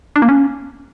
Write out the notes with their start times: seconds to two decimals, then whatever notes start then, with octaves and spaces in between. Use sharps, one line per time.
0.16 D4
0.22 A#3
0.29 C#4